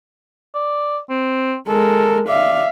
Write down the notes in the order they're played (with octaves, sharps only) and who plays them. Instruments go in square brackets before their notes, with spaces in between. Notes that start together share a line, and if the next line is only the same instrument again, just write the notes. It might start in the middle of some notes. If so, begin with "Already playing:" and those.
[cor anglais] D5
C4
[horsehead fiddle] G#3 A#4 [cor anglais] A4
[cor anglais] D5 [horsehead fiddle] E5 F5